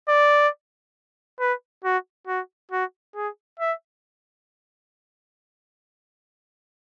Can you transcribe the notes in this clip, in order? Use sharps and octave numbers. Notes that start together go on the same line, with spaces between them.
D5
B4
F#4
F#4
F#4
G#4
E5